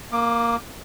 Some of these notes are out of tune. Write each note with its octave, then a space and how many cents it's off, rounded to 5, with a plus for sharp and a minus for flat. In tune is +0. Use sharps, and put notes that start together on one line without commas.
A#3 +0 D6 +20